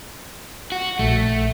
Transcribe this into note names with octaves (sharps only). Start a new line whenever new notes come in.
F#4
A#1 A3